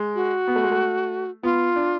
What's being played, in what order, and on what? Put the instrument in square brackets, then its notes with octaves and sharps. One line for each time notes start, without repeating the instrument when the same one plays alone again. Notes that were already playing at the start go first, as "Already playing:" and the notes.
Already playing: [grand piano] G#3
[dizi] F#4
[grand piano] B3
A3
G#3
A3
[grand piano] B3 [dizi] F4
[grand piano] D4